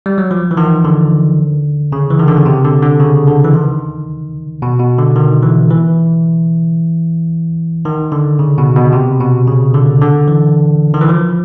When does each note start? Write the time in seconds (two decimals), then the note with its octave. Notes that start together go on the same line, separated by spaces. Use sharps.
0.06 G3
0.18 F#3
0.31 F3
0.51 E3
0.57 D#3
0.85 D3
1.92 C#3
2.10 E3
2.19 D#3
2.28 D3
2.37 C#3
2.46 C3
2.65 D3
2.82 D3
3.00 C#3
3.27 D3
3.44 E3
3.54 D#3
4.62 B2
4.79 B2
4.98 D3
5.16 D#3
5.43 E3
5.70 E3
7.85 D#3
8.12 D3
8.39 C#3
8.58 B2
8.76 B2
8.93 C3
9.20 B2
9.47 C#3
9.74 D3
10.01 D3
10.28 E3
10.94 D#3
11.01 E3
11.09 F3